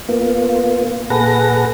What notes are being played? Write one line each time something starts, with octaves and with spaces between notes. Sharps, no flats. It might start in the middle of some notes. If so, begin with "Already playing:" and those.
A#3 B3 F4
A#2 G#4 A4 B4 F#5 A#6